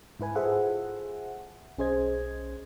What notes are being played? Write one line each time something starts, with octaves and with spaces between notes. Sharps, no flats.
G#2 E4 B4 G#5
F4 G#4 A4 C5 E5 F#5
B1 C#4 G#4 C5 D#5 G#6